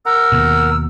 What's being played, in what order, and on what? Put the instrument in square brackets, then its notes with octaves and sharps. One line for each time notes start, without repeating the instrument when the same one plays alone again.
[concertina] A#4 F#5 A#5 [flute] E6
[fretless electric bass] D#2 B2